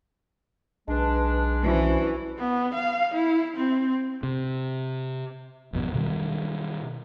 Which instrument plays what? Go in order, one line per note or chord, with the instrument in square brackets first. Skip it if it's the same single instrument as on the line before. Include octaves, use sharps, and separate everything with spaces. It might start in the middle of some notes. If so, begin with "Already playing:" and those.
[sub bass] B1 [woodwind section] G#3 D4 [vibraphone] B4 A5
[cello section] E3 [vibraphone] C#4 C5 G#5 [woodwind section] D4 F#4
[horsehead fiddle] B3
F5
E4
C4
[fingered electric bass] C3
G#1 F2 B2
B2 D#3 G3